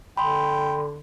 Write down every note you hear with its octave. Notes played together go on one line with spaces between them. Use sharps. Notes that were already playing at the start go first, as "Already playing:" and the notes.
D3 G5 B5 C6